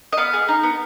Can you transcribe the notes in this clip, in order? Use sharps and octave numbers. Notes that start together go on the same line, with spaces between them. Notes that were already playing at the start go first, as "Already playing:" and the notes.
D#5
B3 F5
G#4
D#4
B3